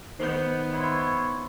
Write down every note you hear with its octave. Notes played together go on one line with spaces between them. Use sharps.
D#3 B3 C5 G6
E4 C#5 C6